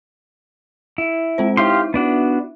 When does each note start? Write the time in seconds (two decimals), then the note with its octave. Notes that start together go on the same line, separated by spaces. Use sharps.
0.98 E4
1.38 G#3 C4 C5
1.57 D#4 E4 G4 E5 F5 C6
1.94 B3 D4 F#4